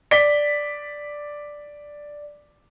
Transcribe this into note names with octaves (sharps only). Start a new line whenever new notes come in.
D5 B6 G7